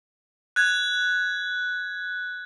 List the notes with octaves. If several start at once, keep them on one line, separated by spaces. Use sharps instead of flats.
F#6 G#6